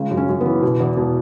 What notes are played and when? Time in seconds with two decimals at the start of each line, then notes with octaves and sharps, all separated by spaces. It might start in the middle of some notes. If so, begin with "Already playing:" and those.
Already playing: C#2 C#3
0.11 F#2
0.17 C#4
0.29 F#2
0.41 E3 B3
0.62 B2
0.80 E2
0.97 B2